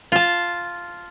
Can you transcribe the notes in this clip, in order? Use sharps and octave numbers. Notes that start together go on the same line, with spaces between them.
F4 A5